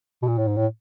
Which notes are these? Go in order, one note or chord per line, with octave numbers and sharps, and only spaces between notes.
B2
A#2
A2
G#2
A2